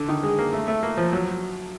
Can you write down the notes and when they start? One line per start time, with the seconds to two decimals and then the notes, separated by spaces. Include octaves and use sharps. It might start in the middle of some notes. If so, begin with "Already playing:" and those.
Already playing: D3
0.09 D#3
0.23 G#3
0.39 A#3
0.53 A3
0.68 A3
0.83 A#3
0.97 F3
1.13 F#3